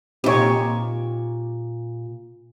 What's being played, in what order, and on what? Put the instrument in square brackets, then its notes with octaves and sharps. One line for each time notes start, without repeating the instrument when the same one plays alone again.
[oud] A#2 G4 [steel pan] C4 D#4 C#5